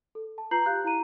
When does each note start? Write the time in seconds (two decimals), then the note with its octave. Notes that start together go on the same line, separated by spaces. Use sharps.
0.15 A4
0.38 A5
0.51 F4 B4 A#5 G6 C7 F#7
0.66 G4 F5 F#6 G6
0.84 E4 A#5 D#7